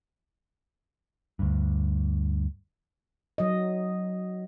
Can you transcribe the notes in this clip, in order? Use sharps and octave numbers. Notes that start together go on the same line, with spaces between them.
D2 G2
F#3 D#5